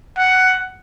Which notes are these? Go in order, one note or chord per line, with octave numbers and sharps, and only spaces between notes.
F#5